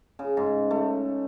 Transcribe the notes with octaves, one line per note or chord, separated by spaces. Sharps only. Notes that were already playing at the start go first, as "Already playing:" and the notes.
C#3
G#2
A3